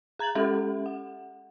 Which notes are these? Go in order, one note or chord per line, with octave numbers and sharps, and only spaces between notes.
G#4 A#5 G#6 A6 F#7
G#3 C#4 G4 A4 E5
F#5